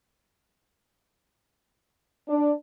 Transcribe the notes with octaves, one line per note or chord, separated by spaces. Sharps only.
D4